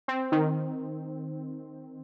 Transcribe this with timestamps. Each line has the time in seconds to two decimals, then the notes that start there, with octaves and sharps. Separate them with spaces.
0.08 C4
0.32 D#3